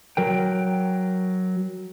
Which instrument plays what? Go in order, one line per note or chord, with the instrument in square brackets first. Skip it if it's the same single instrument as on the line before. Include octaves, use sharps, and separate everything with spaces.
[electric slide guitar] F#3 A#4 G5